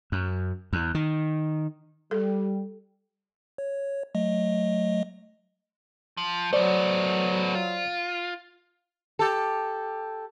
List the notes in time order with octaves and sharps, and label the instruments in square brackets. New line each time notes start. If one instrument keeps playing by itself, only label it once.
[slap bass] F#2
E2
D#3
[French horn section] G3 [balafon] A4
[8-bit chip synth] C#5
F#3 A3 D#5
[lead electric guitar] F3
[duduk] F#3 [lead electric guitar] A3 B3 [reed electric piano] C5 D5
[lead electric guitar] F4
[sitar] G4 A4